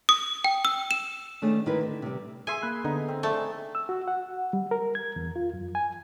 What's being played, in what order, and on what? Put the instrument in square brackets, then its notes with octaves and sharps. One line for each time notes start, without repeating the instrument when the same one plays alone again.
[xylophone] D#6
G5
E6
E7
[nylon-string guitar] D#3 A3 C#4 D4 G#4
G#2 D#3 C4 E4 A#4 B4
D3
C3 G3
[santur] G#4 E5 C6 [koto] G#5
[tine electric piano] A#3 B5 F#6
[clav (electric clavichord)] D3 [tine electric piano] B3 [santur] D#4
[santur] C4
[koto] A3 [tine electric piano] D5
[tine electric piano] G#5
[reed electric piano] E6
F#4
F#5
G3
A#4
G#6
E2
F4
F#2
G#5